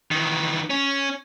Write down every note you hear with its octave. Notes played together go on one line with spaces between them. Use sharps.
D#3 E3
C#4